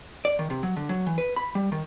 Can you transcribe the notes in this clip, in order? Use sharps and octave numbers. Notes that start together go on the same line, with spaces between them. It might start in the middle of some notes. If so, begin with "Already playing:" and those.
D5
D#3
C3
F#3
D3
F#3
E3
B4
B5
G3
D#3